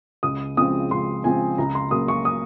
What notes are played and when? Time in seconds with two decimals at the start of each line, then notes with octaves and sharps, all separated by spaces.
0.23 C#2 D#6
0.57 C#3 F3 G#3 C4 D#6
0.91 C#2 C6
1.24 C#3 F3 G#3 C4 G#5
1.58 C#2 A#5
1.75 C6
1.91 C#3 F#3 A#3 D#6
2.08 C#6
2.25 D#6